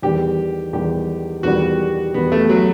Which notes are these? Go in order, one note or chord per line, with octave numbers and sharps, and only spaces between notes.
E2 D#3 G3 G4
E2 D#3 G3 G4
E2 D#3 G3 F#4
E2 D#3 G3 B3
A3
F#3